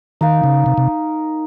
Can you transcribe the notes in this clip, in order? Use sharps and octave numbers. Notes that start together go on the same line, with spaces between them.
D#3 D#4 A#4 F5
C#3
C3
C3